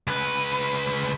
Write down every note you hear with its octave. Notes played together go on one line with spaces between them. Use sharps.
C#2 B4